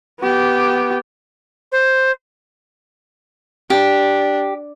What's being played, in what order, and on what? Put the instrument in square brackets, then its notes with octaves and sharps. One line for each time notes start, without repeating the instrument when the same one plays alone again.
[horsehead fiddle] B3 G4
[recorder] C5
[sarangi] D4 [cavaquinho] G4